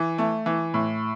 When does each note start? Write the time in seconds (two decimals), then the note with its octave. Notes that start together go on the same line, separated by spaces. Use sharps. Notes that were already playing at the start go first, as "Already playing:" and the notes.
Already playing: E3
0.18 A3
0.46 E3
0.74 A2